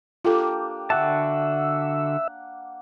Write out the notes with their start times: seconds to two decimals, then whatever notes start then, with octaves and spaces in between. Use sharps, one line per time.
0.24 A#3 D4 F4 G4 A4
0.90 D3 F#4 E5 F#5 A5